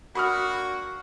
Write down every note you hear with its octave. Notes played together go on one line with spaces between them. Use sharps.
A#3 D4 F#4 B5 D#6 F6